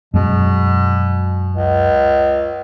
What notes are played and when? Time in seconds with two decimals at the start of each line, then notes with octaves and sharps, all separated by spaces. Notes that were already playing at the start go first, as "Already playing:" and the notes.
0.14 F#2 B2 G#3
1.55 C#2